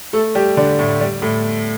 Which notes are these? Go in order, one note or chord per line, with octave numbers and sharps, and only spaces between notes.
A3 A4
G3 G4
D3 D4
A2 A3
G3
A2 A3